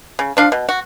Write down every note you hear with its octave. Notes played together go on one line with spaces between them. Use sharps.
C#3
F3 D4 F5
B2
F#4